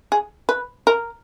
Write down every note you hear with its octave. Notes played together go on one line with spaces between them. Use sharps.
G#4
B4
A#4